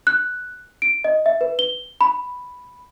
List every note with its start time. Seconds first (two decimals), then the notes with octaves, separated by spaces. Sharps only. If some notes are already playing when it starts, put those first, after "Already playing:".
0.07 F#6
0.82 D7
1.04 D#5
1.26 E5
1.41 B4
1.59 G7
2.01 B5